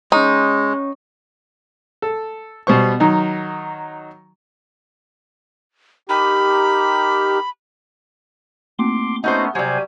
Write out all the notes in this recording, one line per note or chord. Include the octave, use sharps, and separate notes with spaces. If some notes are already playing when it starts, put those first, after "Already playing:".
G#3 C#4 D#4 C#5 C#6
A4
B2 G3 C5 C#6
D#3 F#3 D#4
D#4 G4 A#4 B5
A3 A#3 C4 C6 D6
A3 B3 C#4 D#4 F#4 C5 A#5 D#6
C3 F#3 G3 C5 G#5